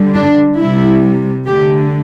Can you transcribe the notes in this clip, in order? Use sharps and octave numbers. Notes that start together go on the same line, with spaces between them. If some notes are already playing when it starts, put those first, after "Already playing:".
Already playing: D3 G3
D4
C3 G3 E4
D3 A3 G4